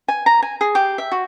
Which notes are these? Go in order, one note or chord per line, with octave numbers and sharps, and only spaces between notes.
G#5
A#5
G#5
G#4
G4
E5
F#4